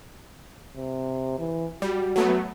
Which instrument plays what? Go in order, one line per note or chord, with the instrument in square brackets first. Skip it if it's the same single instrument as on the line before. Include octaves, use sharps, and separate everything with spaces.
[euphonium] C3
E3
[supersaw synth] G3 [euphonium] F#4
[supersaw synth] F#3 A3 B3